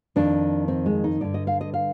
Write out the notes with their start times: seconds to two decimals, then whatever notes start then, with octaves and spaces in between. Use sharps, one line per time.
0.16 F2 D#3 D4
0.68 C4
0.86 G#3
1.04 D#4
1.21 G2 D3 D5
1.34 D#5
1.47 F5
1.61 D#5
1.74 F5